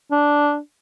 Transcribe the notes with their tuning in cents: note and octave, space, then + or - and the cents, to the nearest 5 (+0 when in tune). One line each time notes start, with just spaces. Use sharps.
D4 -5